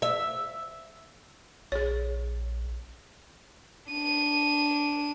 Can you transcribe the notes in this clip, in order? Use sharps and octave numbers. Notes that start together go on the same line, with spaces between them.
E5
A#1 G#4 C#5
D4 D#7